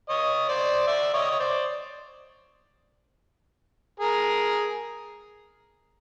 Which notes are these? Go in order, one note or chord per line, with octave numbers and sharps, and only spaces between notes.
C#5 D#5
C5 D5
D5 E5
C#5 D#5
C#5
C5 D5
G#4 A#4